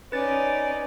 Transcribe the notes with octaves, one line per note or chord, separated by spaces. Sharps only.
C#4 D#4 B4 D5 A6